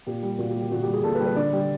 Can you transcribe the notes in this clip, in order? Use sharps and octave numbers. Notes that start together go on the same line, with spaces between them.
A#2 G4
G3
A#2 F#4
G4
G3
G4
A#2 F#4
G4
G3
G#4
A#2 A4
B4
G3
B4
D3 D5
G3